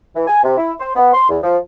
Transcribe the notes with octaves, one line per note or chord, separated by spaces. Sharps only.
E3
G#5
C3
E4
C5
B3
C6
E2
F3